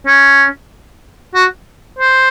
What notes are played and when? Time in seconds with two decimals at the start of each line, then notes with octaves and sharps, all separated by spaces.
0.07 C#4
1.35 F#4
1.99 C5